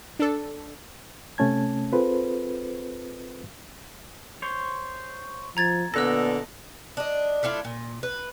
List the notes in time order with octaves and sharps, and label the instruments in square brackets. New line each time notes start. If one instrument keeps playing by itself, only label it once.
[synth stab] D4 A4
[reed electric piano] C3 A3 C#4 A5 G#6
C4 F4 G#4 A4 B4 C5
[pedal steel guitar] C5 C#5
[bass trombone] F3 [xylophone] A#5 G#6 A6
[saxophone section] A#2 D3 [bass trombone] B3 [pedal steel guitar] A4 D#5 [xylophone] E6 F#6 A#6
[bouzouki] D4 D#5
A3 D4 E4 F4
A#2
B4